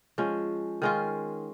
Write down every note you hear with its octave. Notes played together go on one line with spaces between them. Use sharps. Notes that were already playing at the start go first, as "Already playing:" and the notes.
F3 G#3 C#4
D#3 G#3 C#4 F4